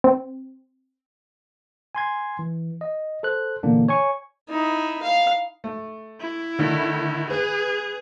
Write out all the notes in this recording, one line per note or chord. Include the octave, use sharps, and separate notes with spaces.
C4
G#5 C6 G#6
E3
D#5
A4 C5 F#6
A#2 D3 E3 A#3 B3 D4
C#5 G#5 C#6
D#4 E4
F5
A3
E4
A2 D3 D#3
G#4 B4